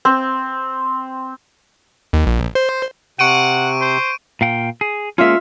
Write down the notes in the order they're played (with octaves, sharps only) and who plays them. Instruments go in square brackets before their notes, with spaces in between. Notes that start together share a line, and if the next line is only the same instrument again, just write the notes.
[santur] C4
[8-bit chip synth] D#2
A#1
C5
[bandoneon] C3 [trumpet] F#5 [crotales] C#6 D7 D#7
[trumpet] C5
[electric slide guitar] A#2 F5 G5
G#4
[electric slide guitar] G#3 A#3 C#4 [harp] F4 E5